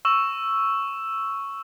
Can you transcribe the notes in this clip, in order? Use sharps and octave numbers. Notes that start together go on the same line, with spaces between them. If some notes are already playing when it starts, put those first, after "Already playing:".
C#6 E6 E7